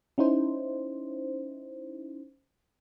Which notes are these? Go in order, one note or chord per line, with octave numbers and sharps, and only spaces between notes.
C#4 D#4 E4 C5